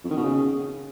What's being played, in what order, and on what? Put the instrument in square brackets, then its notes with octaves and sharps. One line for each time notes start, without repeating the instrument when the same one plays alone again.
[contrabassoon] F2
D#3
B2
C#3